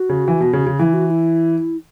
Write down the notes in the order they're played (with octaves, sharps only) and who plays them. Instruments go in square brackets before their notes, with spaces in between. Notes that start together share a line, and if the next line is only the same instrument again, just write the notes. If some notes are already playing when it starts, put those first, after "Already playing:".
Already playing: [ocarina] F#4
[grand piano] C#3
E3
B2
C#3
C#3
[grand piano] E3 [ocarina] E4
[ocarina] F#4
F#4
E4